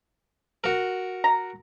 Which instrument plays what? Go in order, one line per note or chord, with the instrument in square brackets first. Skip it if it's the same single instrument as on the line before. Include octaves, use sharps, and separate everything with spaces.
[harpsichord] F#4 A#4
[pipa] A#5